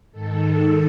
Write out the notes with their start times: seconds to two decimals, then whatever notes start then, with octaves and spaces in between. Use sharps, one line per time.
0.12 G#2 D#3 A4